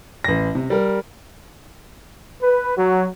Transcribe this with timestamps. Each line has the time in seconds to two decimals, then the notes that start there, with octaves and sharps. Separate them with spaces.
0.24 A1 A#6
0.55 C3
0.70 G3 A#4
2.42 B4
2.77 F#3